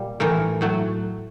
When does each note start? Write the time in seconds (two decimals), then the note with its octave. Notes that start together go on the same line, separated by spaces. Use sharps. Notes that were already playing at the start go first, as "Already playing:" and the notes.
Already playing: A#2 G3
0.20 A2 E3 A3 A#4
0.61 A2 F#3 A3